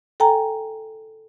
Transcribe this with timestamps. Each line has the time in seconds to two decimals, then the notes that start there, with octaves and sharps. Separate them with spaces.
0.20 A4 G5 G#5 A#5